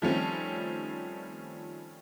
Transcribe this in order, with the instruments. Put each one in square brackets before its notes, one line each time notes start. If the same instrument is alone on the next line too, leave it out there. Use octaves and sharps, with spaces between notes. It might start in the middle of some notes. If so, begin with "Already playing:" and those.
[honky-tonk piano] D#3 F3 G3 A3 C4 C#4